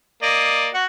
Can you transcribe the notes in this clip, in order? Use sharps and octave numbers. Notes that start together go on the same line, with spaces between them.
A#3 D5 D#5
F#4 F#5